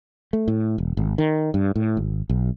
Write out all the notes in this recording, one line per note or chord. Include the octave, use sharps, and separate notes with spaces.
A3
A2
E1
G#1
D#3
G2
A2
G#1
B1